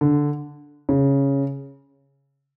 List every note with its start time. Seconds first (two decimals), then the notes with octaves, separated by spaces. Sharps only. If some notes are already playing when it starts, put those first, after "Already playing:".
0.01 D3
0.89 C#3